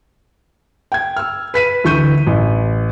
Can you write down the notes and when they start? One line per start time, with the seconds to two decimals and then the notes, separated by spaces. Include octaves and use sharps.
0.92 G5 G#6
1.16 E6 F6
1.54 B4 B6 D#7
1.84 D2 E3 C#6 G6 D#7
2.27 A1